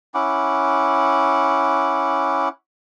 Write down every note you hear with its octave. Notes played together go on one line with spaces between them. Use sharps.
C#4 E4 F#5 D6